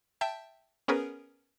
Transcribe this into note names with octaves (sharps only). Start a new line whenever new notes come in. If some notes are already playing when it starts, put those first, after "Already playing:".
E5 G5 A5 G6
B3 C#4 G#4 A#4 B4